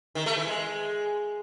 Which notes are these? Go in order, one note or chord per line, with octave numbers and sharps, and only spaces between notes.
D#3
A3
E3
G#3